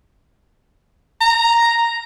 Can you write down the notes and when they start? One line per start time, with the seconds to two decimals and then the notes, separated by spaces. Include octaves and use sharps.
1.21 A#5